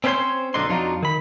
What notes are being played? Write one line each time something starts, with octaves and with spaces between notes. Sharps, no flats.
C4 C#4 E4 C5 C#5 C6
B1 D3 D4 D#4 C6
F2 F#3 D4 D#4 F4
D#3 B5